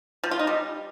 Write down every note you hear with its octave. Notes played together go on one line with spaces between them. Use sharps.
F3
F4
D#4
G3